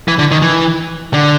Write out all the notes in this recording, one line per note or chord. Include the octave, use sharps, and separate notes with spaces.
E3
D3
D#3
E3
D3